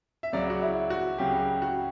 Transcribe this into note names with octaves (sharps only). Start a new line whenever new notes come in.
E5
C#2 C#3 F#3 D5
F#4
E4
F#4
C#2 C#3 F#3 G4
G4
F#4